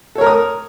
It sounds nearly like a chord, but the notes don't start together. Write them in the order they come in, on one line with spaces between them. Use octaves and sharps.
A4 C#5 A#4 A#5 D#6